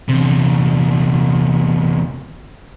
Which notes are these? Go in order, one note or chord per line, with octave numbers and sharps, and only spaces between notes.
E2 C3